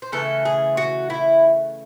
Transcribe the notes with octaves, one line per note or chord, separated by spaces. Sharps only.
C5
C#3 E3 A3 A4
G#4
F#4
E4